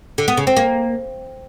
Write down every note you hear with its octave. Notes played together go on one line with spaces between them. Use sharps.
D3
B3
C#3
C4
A#3